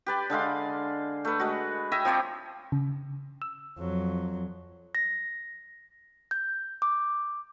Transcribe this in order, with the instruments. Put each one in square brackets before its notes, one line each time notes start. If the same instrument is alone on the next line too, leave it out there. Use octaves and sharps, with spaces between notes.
[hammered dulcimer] G4 B4 D5
D3 G#3 F5 C6
A3 B4
G#3 F#4
C#5 D#5 E5 G5
F3 C4 C#5 D5
[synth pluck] C#3
E6
[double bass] F2 F#3
[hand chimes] A#6
G6
D6